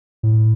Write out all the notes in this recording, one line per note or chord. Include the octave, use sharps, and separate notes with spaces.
A2